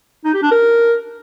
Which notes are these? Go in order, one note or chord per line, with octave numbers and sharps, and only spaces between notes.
D#4
G4
D4
A#4